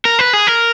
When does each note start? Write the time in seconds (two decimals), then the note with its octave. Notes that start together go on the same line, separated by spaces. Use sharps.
0.05 A#4
0.19 B4
0.33 G#4
0.47 A#4